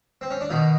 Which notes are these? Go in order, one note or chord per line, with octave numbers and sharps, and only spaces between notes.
C4
C#4
D4
B2 D#3 D#4